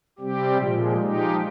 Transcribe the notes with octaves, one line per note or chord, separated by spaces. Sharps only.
C3 G3 C4 G4
A#2 F3 G#3
F3 G#3 D#4 G4